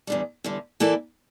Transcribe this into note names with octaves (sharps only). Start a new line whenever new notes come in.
E2 D3 G3
E2 D3 G3
E3 A#3 E4 A4 D5